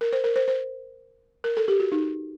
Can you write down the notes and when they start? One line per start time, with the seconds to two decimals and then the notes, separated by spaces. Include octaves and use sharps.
0.01 A#4
0.13 C5
0.24 A#4
0.36 C5
0.48 C5
1.44 A#4
1.57 A4
1.68 G4
1.80 F#4
1.92 D#4